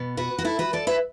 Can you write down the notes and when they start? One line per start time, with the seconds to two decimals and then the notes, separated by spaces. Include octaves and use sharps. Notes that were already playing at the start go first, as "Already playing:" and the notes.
Already playing: B2 B3
0.17 F#4 B4
0.39 F#4
0.45 E4 A4
0.59 F#4 B4
0.73 A4 D5
0.87 B4 E5